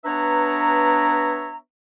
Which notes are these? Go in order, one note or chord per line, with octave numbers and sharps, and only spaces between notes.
B3 D4 B4 C#5 E5 A#5